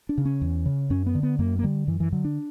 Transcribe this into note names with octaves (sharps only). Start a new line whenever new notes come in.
D4
C#3
C#4
E2
C#3
F#2 C#4
B3
D3
B3
F#2 A#3
A#3
D3 G3
F#2 E3
E3
D3 F#3
D4